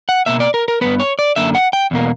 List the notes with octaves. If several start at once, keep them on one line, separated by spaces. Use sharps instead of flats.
F#5
B2 A#3 E5
D5
A#4
A#4
G2 E3 B3 B4
C#5
D5
F#2 D3 A#3 E5
F#5
G5
E2 B2 A#3